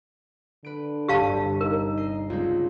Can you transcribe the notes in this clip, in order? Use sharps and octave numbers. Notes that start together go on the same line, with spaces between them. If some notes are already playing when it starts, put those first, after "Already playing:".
D3 B4 D7
G1 C2 G2 G4 F5 A5
D#4 A#4
D#5 C7
C#2 C4 F4